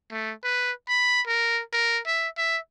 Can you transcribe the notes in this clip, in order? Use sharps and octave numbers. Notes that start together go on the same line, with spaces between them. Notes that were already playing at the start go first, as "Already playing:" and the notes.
A3
B4
B5
A#4
A#4
E5
E5